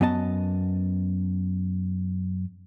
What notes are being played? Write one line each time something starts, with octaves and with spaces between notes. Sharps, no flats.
F#2 B3 D#5 A5